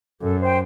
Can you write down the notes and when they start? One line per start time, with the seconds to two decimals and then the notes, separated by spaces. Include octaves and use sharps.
0.21 F#2 A4
0.39 C5 G5